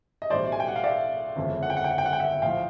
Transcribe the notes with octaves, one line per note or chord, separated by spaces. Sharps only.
D#5
B1 A2 E3 G3 C5 D5
G#5
G5
F#5
F5
D5 E5
G1 F2 C#3 E3 G#3
F#5
G5
F#5
G5
F#5
G5
F#5
G5
E5 F#5
A#1 A2 F3 A3 F5 G5